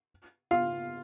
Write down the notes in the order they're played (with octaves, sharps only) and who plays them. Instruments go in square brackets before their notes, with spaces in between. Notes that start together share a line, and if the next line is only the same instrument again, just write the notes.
[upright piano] F4 F5